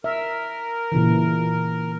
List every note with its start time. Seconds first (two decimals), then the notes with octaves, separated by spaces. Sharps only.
0.04 A#4 E5
0.92 A#2 C#3 E3